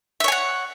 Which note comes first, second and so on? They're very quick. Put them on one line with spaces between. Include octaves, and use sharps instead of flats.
E5 C#5 G#5 F#5